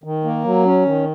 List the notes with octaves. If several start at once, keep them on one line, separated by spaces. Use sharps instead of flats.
D#3
A#3
F#3
C#4
D#3